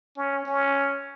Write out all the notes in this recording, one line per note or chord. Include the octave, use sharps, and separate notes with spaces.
C#4
C#4